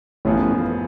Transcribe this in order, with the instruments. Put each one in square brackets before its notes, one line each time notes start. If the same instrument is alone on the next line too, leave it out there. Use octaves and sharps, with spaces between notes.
[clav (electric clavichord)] A1 A2 [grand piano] F#2 C#3 F3 B3